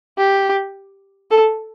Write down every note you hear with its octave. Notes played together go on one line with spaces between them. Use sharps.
G4
A4